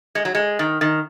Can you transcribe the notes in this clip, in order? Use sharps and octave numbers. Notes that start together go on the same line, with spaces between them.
G#3
F#3
G#3
D#3
D#3